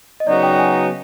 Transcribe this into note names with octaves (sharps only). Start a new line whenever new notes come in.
D#5
C#3 F#3 B3 D#4 F#4 D5
G5
G#5